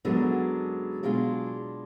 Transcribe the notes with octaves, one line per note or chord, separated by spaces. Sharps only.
F#2 D3 F#3 G#3 B3 D4
B2 G#3 D4 F4